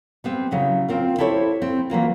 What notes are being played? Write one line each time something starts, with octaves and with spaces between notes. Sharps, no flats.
G3 B3 C4
C#3 F#3 E4
C4 F4 A#4
E4 G4 A4 C5 C#5
C4
E3 F#3 A#3 F4